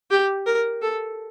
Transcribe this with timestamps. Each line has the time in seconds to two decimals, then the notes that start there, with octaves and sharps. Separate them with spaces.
0.11 G4
0.47 A#4
0.82 A4